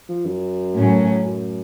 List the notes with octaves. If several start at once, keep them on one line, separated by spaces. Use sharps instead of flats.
F3
F#2
A2 F#3 C#4
F#2